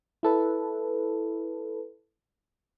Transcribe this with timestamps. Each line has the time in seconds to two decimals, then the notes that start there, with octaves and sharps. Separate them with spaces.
0.23 E4 A4 B4